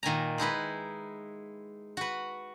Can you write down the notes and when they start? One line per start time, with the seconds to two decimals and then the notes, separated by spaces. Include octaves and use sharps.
0.03 A#2 D#3 G#5 A#5
0.38 G#3 D#4 E4 B4
1.97 F#4 B4